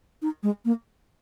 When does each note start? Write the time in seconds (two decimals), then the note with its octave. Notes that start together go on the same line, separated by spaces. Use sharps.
0.22 D#4
0.43 G#3
0.65 A#3